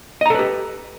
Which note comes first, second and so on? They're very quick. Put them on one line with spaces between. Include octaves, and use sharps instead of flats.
D#5 A#5 A4 B4 G4